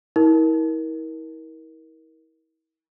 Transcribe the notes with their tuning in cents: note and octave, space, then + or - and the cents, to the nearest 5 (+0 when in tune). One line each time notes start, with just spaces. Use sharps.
E4 -40 A#4 +15